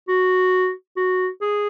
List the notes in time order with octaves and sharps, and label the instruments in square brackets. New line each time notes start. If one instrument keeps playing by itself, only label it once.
[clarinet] F#4
F#4
G#4